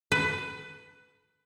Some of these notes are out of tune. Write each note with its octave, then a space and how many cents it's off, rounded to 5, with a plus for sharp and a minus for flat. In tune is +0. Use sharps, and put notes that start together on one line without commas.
B4 +15